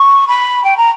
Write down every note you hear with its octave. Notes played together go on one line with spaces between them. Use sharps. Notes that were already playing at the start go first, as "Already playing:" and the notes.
Already playing: C#6
B5
G5
A#5